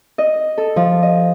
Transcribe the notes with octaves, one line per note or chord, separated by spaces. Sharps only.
D#5
A4
F3
D#5